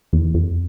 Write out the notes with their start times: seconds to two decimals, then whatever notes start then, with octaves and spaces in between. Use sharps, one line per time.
0.13 E2
0.34 F2